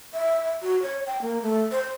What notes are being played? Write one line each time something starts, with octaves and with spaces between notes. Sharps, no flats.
E5
F#4
C#5
G5
A#3
A3
C5